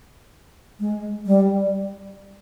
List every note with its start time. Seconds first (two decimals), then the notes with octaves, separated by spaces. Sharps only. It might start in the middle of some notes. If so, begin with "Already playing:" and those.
0.80 G#3
1.27 G3